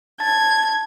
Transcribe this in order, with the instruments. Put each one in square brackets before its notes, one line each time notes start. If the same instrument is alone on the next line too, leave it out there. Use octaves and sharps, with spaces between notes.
[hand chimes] A5 A6 [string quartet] G#6